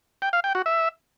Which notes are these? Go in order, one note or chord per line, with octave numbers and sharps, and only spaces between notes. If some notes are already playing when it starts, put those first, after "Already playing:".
G5
F5
G5
F#4
E5